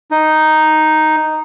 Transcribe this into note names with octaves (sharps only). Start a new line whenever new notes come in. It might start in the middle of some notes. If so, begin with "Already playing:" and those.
D#4